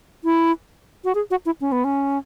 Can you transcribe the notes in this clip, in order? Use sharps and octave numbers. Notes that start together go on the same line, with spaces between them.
E4
F#4
G#4
F#4
E4
C#4
B3
C#4